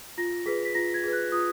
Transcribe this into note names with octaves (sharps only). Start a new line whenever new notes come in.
F4 A#6
G#4 B4 B6
B6
F4 A#6
G#6
G#4 B4
F#6
F4 D#6